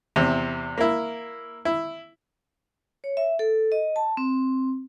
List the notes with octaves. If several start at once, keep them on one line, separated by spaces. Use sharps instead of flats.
E2 C3
A#3 E4
E4
C#5
E5
A4
D#5
A5
C4